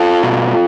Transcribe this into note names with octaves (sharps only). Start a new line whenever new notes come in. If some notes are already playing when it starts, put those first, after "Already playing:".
Already playing: F4 A4
B2